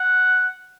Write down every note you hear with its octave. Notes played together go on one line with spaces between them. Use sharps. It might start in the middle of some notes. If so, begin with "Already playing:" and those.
Already playing: F#5